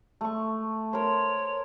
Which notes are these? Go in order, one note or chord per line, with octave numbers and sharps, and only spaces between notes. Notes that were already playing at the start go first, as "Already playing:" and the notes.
A3 C#6
A#4 C5 C#5